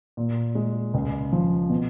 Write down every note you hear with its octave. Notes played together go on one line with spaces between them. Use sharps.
A#2
G#3
C#2
F3
B2